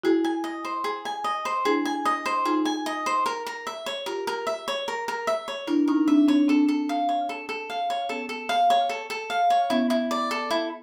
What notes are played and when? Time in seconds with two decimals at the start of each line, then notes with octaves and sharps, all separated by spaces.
0.04 E4 F#4 G#4
0.24 G#5
0.44 D#5
0.65 C5
0.84 G#4
1.05 G#5
1.24 D#5
1.45 C5
1.65 D4 E4 G#4
1.85 G#5
2.05 D#5
2.26 C5
2.45 D#4 F4 G#4
2.65 G#5
2.86 D#5
3.06 C5
3.26 A#4
3.46 A#4
3.67 E5
3.86 C#5
4.06 F4 G4 A#4
4.27 A#4
4.47 E5
4.68 C#5
4.88 A#4
5.08 A#4
5.27 E5
5.48 C#5
5.67 D4 E4 A#4
5.88 C#4 D#4 A#4
6.08 C4 D4 E5
6.28 C4 D4 C#5
6.48 C4 D4 A4
6.68 A4
6.89 F5
7.09 C#5
7.29 A4
7.49 A4
7.70 F5
7.90 C#5
8.09 B3 C#4 A4
8.29 A4
8.49 F5
8.70 C#5
8.89 A4
9.10 A4
9.30 F5
9.50 C#5
9.70 B3 C#4 E4
9.90 E4
10.11 D5
10.31 A4
10.51 E4